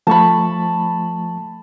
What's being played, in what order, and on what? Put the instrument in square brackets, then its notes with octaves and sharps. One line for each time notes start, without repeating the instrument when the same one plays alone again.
[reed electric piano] F3 A3 C#6 [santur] A5 B5